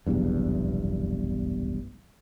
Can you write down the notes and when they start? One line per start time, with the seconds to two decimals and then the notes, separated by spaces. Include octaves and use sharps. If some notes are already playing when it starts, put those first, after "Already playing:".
0.07 F1 B1 E2 G2